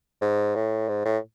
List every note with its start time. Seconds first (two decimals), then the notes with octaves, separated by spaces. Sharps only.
0.21 G#2
0.55 A2
0.89 G#2
1.05 A2